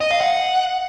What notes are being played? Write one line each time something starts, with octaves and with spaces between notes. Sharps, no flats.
D#5
F5
F#5